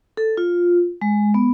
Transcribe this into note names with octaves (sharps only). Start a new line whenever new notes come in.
A4
F4
G#3
B3